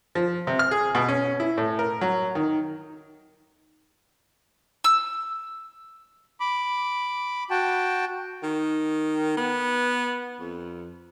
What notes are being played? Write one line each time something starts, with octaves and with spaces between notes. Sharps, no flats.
F3
C3
F6
G#4
B2
C#4
E4
A2
A#4
F#3
D#3
E6
B5 D6
F#4 G5 A5
D#3
B3
F2